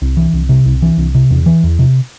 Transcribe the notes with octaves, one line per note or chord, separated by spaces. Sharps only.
C2
E3
C2
C3
C2
E3
C2
C3
E2
E3
E2
C3